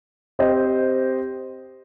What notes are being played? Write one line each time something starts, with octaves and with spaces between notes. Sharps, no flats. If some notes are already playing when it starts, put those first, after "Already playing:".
C4 G4 C5 D#5